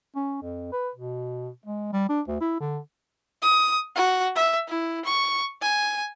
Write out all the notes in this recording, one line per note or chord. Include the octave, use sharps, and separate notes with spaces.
C#4
F2
B4
B2
G#3
G3
D4
D2
E4
D3
D#6
F#4
E5
E4
C#6
G#5